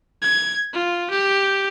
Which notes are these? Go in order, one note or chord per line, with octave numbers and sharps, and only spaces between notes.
G#6
F4
G4